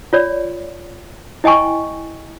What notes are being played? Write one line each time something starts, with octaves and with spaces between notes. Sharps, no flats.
F4 C#5 D5
E4 D#5 G5 G#5 C#6